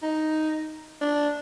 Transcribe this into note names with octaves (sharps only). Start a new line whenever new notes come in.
D#4
D4